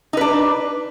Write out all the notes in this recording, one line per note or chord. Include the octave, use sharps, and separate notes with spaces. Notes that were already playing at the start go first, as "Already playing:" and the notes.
D4 D#4 B4